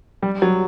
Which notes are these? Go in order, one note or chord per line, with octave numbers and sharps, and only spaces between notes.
G3
F#3